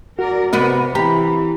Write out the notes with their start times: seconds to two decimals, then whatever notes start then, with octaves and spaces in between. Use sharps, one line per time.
0.19 F#4 A#4 D5
0.53 C3 B3 C4 A#4 D#5
0.95 E3 G4 A#5 B5